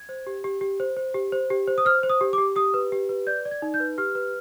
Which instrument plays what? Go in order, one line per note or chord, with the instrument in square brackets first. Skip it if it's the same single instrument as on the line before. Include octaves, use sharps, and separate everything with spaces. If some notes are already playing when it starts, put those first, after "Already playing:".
Already playing: [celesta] G#6
C5
G4
G4
G4
C5
C5
G4
C5
G4
C5
D#6
C5 F6
C5
D#6
G4
D6
G4
G4 D#6
B4
G4
B4
D5 G6
D5
G#6
D#4
G6
B4
G4 F6
B4